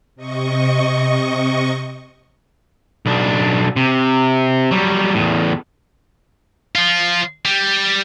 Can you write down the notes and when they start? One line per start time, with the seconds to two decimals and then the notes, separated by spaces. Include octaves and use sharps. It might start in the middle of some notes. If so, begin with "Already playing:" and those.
0.15 C3 D#5 C#6
3.06 B1 D4
3.76 C3
4.71 F#3 G3
5.15 E2 A2
6.75 F3 F4
7.45 G3